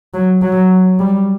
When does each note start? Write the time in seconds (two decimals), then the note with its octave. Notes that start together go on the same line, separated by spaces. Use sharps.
0.14 F#3
0.42 F#3
0.99 G3